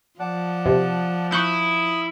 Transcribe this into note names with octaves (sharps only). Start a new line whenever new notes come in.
F3 D5 F#5 A5
C3
E4 C#6 D#6 E6 F#6 G6